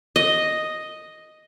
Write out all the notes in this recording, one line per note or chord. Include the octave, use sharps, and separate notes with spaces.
D#5